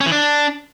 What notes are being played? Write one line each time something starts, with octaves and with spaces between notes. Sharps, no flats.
C#4
E3
D4